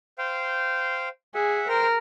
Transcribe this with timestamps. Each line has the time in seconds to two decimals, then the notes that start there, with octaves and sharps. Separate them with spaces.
0.18 C5 F5 G5
1.35 G#4 E5 F#5
1.68 A#4 C5 G5 F6